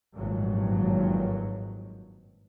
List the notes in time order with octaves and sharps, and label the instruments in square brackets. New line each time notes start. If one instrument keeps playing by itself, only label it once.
[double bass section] G#1 G2 A#2 D#3 F3 F#3